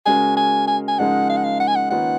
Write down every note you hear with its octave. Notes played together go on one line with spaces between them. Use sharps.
C#3 G#3 C#4 F#4 A#4 G#5
G#5
G#5
G#5
C#3 F3 G#3 D#4 A#4 F#5
F5
F#5
F5
F#5
G#5
F#5
D#3 A#3 C#4 F4 B4 F#5